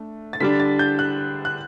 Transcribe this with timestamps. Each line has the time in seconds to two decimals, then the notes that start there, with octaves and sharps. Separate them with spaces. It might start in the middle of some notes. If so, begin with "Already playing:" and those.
Already playing: A3 D4
0.33 A6
0.40 D3 G3 D4 B6
0.60 A6
0.79 G6
0.99 F#6
1.45 F#6